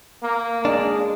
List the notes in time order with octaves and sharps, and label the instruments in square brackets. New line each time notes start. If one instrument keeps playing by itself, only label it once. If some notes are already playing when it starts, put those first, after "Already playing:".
[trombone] A#3
[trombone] G#3 [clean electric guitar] D4